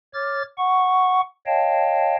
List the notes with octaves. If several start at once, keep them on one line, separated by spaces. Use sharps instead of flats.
C#5 D6 F6 A6
F#5 C#6
C#5 D#5 F5 G5 A5